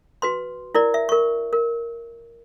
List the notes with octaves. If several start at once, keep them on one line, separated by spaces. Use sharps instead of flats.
F#4 B4 C6
E4 A#4 D5
E5
A#4 C#6
A#4